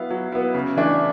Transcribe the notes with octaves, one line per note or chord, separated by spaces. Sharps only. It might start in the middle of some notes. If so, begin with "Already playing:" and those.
Already playing: F#3 B3 E4 F5
F#3
B3 E4
C#3
E3 A3 D4